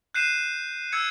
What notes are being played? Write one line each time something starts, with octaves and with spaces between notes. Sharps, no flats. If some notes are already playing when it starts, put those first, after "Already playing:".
F#6 G6 C7 D#7 E7
E6 G#6 C#7